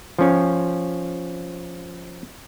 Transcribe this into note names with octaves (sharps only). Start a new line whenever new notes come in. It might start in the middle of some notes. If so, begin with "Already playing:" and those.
F3 C#4